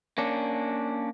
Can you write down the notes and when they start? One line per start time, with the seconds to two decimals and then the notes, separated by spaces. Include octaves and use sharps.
0.18 A#3 C#4 D4